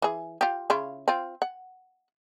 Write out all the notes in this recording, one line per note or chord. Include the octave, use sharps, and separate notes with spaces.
E3 G#4
F4 G4
C#3 E4 F4
C4 F4
F#5